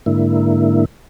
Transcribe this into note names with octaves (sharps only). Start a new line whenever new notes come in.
G#2 D3 A#3 E4